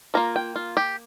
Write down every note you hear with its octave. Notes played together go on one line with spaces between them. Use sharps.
F3 A#3 F4 A#5
G5
F4
G4